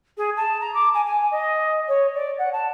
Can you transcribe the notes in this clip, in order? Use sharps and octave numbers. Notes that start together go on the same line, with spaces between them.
G#4
A5
A#5
D6
G#5
G#5
D#5
C#5
D5
F#5
A5